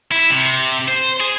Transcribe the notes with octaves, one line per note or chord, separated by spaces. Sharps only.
E4
C3
C5
G#4